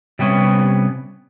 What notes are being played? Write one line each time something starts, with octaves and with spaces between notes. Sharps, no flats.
C3 G3 B3 C#4